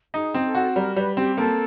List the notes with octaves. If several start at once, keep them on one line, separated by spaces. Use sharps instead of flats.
D#4 G#4
C4
A4
F#4
G3 A#4
G3 B4
C4 G4
A#3 A4